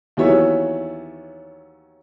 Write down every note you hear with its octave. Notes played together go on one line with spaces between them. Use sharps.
D#2 E3 F#3 B3 C#5 E5